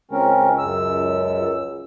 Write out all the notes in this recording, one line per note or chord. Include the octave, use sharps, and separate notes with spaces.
C#2 C4 C#4 A#4
F#2 E6